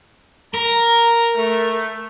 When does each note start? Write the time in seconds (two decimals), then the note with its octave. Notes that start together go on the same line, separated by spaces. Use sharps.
0.54 A#4 A#5
1.35 A3